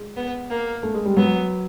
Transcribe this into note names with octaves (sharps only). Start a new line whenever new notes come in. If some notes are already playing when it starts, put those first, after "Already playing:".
Already playing: G#3
B3
A#3
A3
G#3
G3
F#3 B3